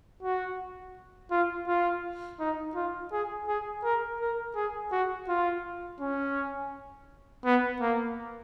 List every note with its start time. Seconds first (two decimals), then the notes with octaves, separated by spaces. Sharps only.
0.23 F#4
1.31 F4
1.67 F4
2.39 D#4
2.75 F4
3.12 G#4
3.48 G#4
3.84 A#4
4.20 A#4
4.55 G#4
4.92 F#4
5.28 F4
6.00 C#4
7.45 B3
7.81 A#3